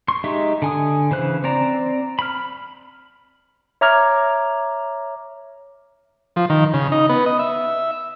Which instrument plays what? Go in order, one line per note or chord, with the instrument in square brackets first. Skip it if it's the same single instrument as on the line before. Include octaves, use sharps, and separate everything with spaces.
[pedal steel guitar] C6 C#6
G#3 D#4 G4 D#5 E5
D3 G#5 D#6
C#3 E3 C5 F#6
C4 D5 A#5
B5 F6
[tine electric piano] C#5 E5 A#5 D6 F6 G#6
[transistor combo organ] F3
D#3
C#3
D#4
B3
D#5
E5